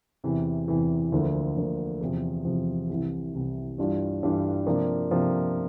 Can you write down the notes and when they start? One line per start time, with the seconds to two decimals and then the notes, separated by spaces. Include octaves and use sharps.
0.24 E2 C3 E3
0.68 E2 C3 E3
1.12 D2 D3 F3 A#3
1.57 D2 D3 F3 A#3
2.01 E2 C3 F3
2.45 E2 C3 F3
2.89 C2 C3 E3
3.34 C2 C3 E3
3.78 G2 E3 G3 D4 F4
4.23 G2 E3 G3 D4 F4
4.66 C3 F3 A#3 D4 F4
5.11 C3 F3 A#3 D4 F4